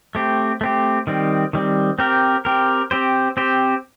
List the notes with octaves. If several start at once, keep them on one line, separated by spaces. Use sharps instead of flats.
A3 C4 G4
A3 C4 G4
D#3 G3 C4
D#3 G3 C4
C4 G4 A#4
C4 G4 A#4
C4 G4 C5
C4 G4 C5